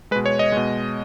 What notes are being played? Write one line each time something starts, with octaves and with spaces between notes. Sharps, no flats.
B2 G#3 B4
C#5
D#5
B2 G#3